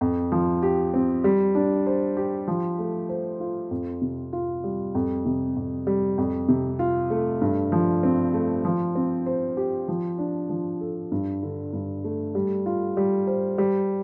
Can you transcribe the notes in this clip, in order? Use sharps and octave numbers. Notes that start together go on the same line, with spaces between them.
F2
F3
G4
C4
G3
D4
C5
G4
F3
A3
C5
F4
F2
C3
F4
G3
F2
C3
F2
G3
F2
C3
F4
A3
G2
F3
C4
A3
F3
C4
C5
G4
F3
D4
F3
A4
G2
D3
G2
A3
G3
F4
G3
C5
G3